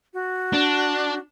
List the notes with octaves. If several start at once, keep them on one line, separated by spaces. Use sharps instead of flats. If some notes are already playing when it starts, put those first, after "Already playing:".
F#4
D4